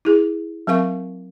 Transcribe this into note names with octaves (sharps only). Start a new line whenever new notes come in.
E4 G#4
F#3 C4 A#4 F5 C#6